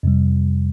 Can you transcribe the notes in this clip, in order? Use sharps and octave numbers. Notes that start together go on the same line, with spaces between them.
F2 C3 G3